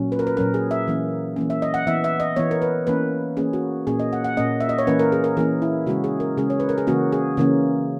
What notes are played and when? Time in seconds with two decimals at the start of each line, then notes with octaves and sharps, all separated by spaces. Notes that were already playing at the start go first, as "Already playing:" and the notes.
Already playing: A#2 F#3 C#4
0.12 B4
0.19 A#4
0.27 B4
0.37 A#2 F#3 C#4 A#4
0.54 G#4
0.71 E5
0.88 E3 A#3 C#4
1.36 E3 A#3 C#4
1.50 E5
1.62 D#5
1.74 F#5
1.87 E3 B3 E5
2.04 E5
2.20 D#5
2.36 E3 B3 C#5
2.51 A#4
2.62 B4
2.87 E3 A#3 C#4 B4
3.37 E3 A#3 C#4 G#4
3.53 F#4
3.87 A#2 A#3 C#4 G#4
3.99 D#5
4.13 F#5
4.24 F#5
4.37 A#2 A#3 C#4 D#5
4.60 E5
4.69 D#5
4.78 C#5
4.87 E3 A#3 C#4 B4
4.99 A#4
5.12 G#4
5.24 A#4
5.37 E3 A#3 C#4 G#4
5.62 E4
5.86 C#3 G#3 C#4 F#4
6.04 G#4
6.20 A#4
6.37 C#3 G#3 C#4 G#4
6.50 C#5
6.60 B4
6.69 A#4
6.78 G#4
6.87 C#3 E3 A#3 C#4 F#4
7.12 G#4
7.37 C#3 E3 A#3 C#4